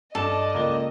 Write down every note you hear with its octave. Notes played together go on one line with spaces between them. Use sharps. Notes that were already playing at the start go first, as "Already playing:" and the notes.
G2 A4 D5 D#5 E7
C#2 A#3 G7